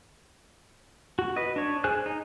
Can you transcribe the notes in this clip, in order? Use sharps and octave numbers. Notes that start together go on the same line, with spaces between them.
F#4
B4 D#5
D4 C#5
G#4 C5 G#5 F#6
D#4